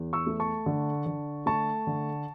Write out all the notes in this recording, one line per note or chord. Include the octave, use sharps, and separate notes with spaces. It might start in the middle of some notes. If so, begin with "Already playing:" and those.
Already playing: E2
C#6 E6
A3
A5 C#6
D3
D3
A3 A5 C#6
D3